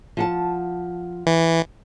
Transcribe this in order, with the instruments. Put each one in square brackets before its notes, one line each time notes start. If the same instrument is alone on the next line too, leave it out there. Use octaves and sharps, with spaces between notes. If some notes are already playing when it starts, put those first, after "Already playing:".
[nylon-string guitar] F3 F#5 A5
[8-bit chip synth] E3